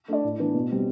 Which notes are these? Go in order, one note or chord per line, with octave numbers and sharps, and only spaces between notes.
A3 D4 A4 D5
A2
E3 B3 D4
B2
G3 C4